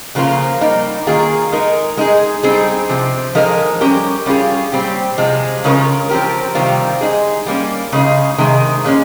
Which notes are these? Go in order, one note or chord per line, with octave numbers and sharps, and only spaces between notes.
C#3 F3 A#3 F4
G3 A#3 D#4
D#3 A#3 F4 G#4
G#3 D#4 A#4
G#3 D#4 G#4
G3 C4 D#4 G#4
C3 F3 C4
F3 G#3 D#4 A#4
G3 C#4 G4 A#4
G3 C#4 F4 G#4
A#2 G3 C4 G4
C3 F3 G#3
C#3 G#3 C#4 F4 A#4
F3 C4 G4 A#4
C3 D#3 G3 C4 F4
G#3 D#4 G#4
G3 A#3 C#4
C#3 G#3 D#4 G#4
C3 D#3 G#3
A#2 G#3 C#4